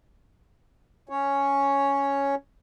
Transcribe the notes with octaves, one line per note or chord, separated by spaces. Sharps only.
C#4 C#5